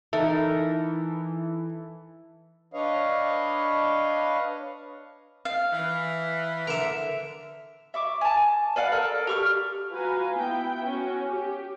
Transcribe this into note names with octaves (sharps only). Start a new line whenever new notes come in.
E3 D#4 A4 A#4 E5
D4 B4 C#5 D#5 F5
F5
E3
D3 A#4 E5
E5 C#6 D6
G#5 A5
B4 D5 F5 F#5
A4 A#4 D5
G4 C#6 F6
F4 F#4 B4 F5 G#5 A#5
B3 E4 G5
C#4 F#4
G4